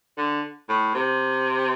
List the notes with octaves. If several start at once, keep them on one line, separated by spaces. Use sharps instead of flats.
D3
A2
C3